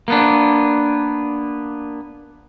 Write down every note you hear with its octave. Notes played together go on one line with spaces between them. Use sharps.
A#3 B3 D4